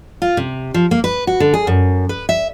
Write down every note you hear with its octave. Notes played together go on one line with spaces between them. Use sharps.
F4
C3
F3
A#3
B4
F#4
D3
G#4
F#2
B4
E5